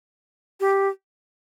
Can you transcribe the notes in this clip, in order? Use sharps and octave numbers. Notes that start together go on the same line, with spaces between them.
G4